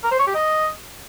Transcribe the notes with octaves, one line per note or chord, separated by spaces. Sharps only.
A#4
C5
C#5
G4
D#5